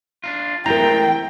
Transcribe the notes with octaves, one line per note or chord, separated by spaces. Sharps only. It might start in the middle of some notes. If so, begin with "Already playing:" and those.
D4 D#4 F4
G#3 A3 C4 E4 A#4 G5 A#5